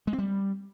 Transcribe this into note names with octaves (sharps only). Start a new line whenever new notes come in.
G#3
C4
G3